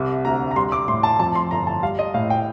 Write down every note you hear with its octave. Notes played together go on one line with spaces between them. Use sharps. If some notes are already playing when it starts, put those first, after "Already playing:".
Already playing: C2 C3
D2 A#5
A#5
G3 C6
D6
A2 C6
A5
F2 A5
C6
G1 A#5
A5
G3 F5
D#5
A2 F5
G5